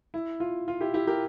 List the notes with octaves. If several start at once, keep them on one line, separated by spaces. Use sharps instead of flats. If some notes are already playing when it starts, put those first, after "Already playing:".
E4
F4
F4
E4 G4
E4 G4
G4 A#4